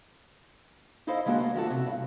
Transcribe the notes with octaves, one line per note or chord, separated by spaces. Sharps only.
D#4 E4 A4 C5 D#5 F5
D3 G3 G#3 A#3 D4 F#4
A3 A#3
E3 F3 F#4 A4
C3 F#4
G2